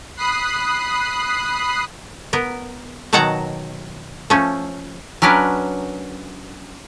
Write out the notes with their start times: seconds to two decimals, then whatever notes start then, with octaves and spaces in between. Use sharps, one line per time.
0.17 B5 D#6 F#6 C7
2.33 B3 A#4
3.13 B2 D#3 F#3 F#5 A5 A#5
4.30 F3 A3 C#4
5.22 F#3 C#4 D4 A#4 B4